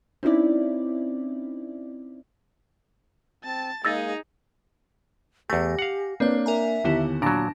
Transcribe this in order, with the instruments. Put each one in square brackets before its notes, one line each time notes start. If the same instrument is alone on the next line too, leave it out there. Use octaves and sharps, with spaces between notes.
[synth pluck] C4 C#4 D#4 E4 D5
[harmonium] C4 [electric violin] A5 A6
[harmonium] G#3 A#3 [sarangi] D#4 [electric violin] G#4 [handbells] E6 A6 A#6
[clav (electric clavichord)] E2 A3 [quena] G4 [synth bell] G#5 A#6
[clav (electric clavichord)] F5 F#5
[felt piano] A#3 D4 [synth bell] C4 C#5 [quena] B4
[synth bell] A#4 G#5 A#5 [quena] E5
[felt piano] D#2 [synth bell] D3 B3 E4
[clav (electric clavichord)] A#2 F#3 [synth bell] D4 A#6 [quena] A5